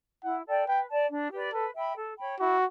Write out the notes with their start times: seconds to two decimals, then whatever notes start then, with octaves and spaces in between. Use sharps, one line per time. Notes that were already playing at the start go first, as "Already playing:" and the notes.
0.24 E4 F#5
0.46 A4 D5 G5
0.67 B4 G5
0.89 D5 A5
1.10 D4
1.32 G4 B4 D5
1.53 A4 B4
1.74 E5 G5 B5
1.96 A4
2.19 C#5 G5 B5
2.40 E4 F#4